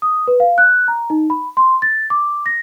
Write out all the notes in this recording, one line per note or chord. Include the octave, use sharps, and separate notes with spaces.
D#6
B4
F5
F#6
A#5
D#4
B5
C6
A6
D6
A#6